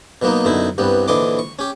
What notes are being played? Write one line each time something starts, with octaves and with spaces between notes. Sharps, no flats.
B2 F#3 A#3 B3 D#4
F#2 B2 D3 D#4 E4
C2 G2 G3 B3
A#1 D3 E3 D#5 C6 D6
C#6
C#4 G4